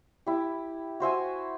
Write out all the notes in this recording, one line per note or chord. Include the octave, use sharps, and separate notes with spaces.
E4 G4
F#4 C5 E5 G#5